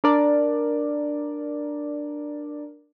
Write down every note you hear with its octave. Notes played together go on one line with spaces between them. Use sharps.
D4 A#4 D5